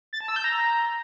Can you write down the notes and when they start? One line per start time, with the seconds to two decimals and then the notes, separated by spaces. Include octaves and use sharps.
0.13 A6
0.21 A5
0.28 E6
0.36 G6
0.44 A#5